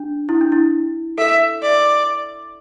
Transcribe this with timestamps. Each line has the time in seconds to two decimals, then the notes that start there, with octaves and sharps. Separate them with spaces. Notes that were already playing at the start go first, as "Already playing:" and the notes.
Already playing: D4
0.29 E4
0.41 D4
0.52 E4
1.18 A4 E5
1.62 D5